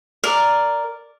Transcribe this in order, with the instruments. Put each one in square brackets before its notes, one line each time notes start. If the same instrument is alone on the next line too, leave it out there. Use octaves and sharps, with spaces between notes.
[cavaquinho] A#4 D5